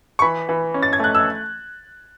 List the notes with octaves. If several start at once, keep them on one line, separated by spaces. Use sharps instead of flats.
C#6
E3 B5
E3
C#4
A6
G#6
A3 F#6
E6